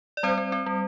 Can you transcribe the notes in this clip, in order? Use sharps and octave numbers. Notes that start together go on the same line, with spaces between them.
D5
G3 C4 C5
C4
C4
G3